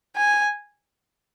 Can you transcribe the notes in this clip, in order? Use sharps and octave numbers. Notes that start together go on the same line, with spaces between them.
G#5